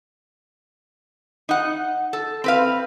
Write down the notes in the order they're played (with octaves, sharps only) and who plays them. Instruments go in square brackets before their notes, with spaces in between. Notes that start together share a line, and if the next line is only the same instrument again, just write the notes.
[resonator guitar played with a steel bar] D#4 F#5
A4
C4 B4 F5